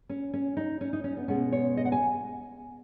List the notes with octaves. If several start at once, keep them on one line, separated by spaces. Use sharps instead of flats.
C#4
C#4
D#4
C#4
D#4
C#4
B3
B2 G#3 B3 C#4
C#5
D#5
F#5
G#5